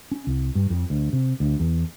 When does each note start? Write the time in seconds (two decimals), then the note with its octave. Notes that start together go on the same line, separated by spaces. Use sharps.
0.11 C#4
0.27 C2
0.55 G2
0.70 F2
0.90 D2
1.13 C3
1.40 D2
1.60 E2